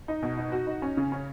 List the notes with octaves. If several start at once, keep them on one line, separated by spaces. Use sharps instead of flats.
D#4
B2
D#4
F#4
D#4
C#4
C#3
C#4